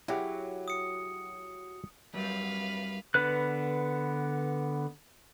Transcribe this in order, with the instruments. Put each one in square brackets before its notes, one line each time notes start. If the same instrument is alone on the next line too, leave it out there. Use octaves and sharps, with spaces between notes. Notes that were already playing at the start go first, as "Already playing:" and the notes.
[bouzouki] F#3 [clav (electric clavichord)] E4 G4 G#4
[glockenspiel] D#6 C#7
[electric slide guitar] F#2 F#3 G3 [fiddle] B4 F5
[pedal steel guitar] D3 B3 B4 F#6